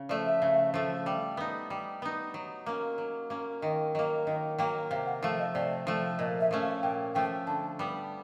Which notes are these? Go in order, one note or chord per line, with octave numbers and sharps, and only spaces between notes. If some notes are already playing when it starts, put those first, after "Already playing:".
Already playing: C#3
F3 A3 D5
E5
C#3
F3 A3
G3
B3 D#4
G3
B3 D#4
F#3
A#3 C#4
F#3
A#3 C#4
D#3 D#5
F#3 A#3 D#5
D#3 D#5
F#3 A#3 G5
C3 F5
F#5
F3 A3 F5
D#5
C3 D5
F3 A3
A#2 D#5
E5
F3 A3 C#4
F5
A#2 G5
F3 A3 C#4 G5
D3 A5
G3 B3